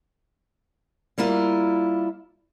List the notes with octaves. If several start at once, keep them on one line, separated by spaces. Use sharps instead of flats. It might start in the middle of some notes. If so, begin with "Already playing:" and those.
G3 A#3 E4 F4